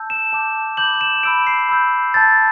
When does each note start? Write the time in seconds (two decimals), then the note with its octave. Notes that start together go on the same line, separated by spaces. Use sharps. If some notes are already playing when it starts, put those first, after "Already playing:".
Already playing: A5 E6 G6
0.10 E7
0.33 A5 D6 G6
0.77 B5 D6 G6 F#7
1.01 E7
1.23 B5 E6 G6 D7
1.47 C7
1.69 B5 E6 G6
2.14 A5 E6 G6 A6